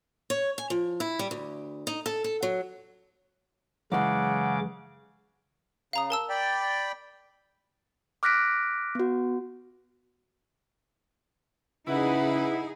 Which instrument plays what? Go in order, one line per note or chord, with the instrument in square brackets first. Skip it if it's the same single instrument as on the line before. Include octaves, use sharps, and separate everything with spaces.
[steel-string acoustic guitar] C#5
G#5
F3
E4
G3
D2
D#4
A4
A4
F#3
[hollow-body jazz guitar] F#2 E3 G#3 [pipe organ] C#3 D6 [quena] F#5
[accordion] C#3 [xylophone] F5 A#5 D#6
[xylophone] A#4 A5 E6
[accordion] D5 G5 B5
[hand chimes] D6 F6 F#6 A#6 B6 D7
B3 F#4
[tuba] C#3 [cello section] D#4 G#4 [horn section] E4 [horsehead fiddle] B4 F#5